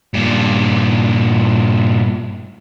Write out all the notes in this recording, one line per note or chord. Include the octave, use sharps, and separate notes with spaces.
G2 A#2